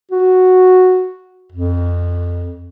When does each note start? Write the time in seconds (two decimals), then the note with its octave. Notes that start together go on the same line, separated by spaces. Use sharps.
0.11 F#4
1.52 F2